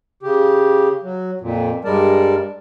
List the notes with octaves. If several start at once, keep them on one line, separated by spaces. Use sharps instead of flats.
C#3 G4
F#3
F2 A#2
G2 G3 G#3 A#4 D5 A5